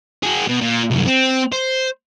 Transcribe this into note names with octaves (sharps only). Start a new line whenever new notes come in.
F#4 G#4
B2
A#2
C2 F#2
C4
C5